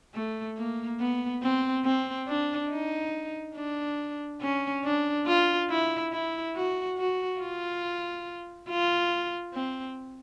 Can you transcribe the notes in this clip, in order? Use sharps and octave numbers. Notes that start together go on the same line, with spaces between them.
A3
A#3
B3
C4
C4
D4
D#4
D4
C#4
D4
F4
E4
E4
F#4
F#4
F4
F4
C4